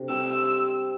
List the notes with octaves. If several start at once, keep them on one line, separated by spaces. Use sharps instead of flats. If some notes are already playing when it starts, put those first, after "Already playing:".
Already playing: C3 D4 A4
G3 C4 G4 E6